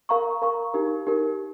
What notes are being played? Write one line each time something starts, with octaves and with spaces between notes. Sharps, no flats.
A#4 F5 A#5 C#6
A#4 F5 A#5 C#6
D#4 G4 A#4
D#4 G4 A#4